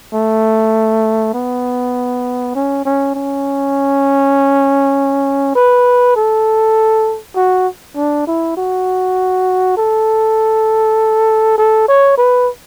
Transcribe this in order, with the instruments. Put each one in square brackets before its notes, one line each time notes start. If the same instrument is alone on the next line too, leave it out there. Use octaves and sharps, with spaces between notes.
[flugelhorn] A3
B3
C#4
C#4
C#4
B4
A4
F#4
D4
E4
F#4
A4
A4
C#5
B4